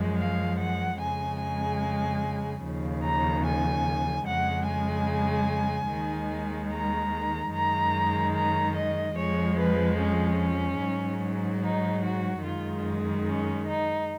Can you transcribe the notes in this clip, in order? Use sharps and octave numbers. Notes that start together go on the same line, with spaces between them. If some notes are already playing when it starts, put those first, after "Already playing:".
Already playing: F#2 F3 G#3
F5
F#5
F2 C#3 G#3 G#5
G#5
D#2 C#3 F3
A#5
G#5
F2 C#3 G#3 F#5
G#5
D#2 D#3 G#3
A#5
F#2 D#3 G#3 A#5
A#5
D#5
F2 F3 G#3 C#5
B4
C#4
G#2 F#3
D#4
F#4
F#2 D#3 G#3 F4
C#4
D#4